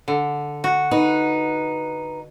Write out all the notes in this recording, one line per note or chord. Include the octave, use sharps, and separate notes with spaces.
D3
F#4
D#4 B4